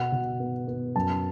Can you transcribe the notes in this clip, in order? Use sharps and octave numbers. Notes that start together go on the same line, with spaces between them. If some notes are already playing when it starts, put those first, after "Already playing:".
Already playing: B2 F#5
B2
B3
B3
F#2 A5